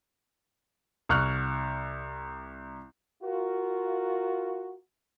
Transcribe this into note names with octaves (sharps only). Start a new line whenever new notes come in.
C2 C#6 F6 F#6
F4 F#4 A#4